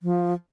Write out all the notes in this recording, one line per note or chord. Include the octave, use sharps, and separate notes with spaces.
F3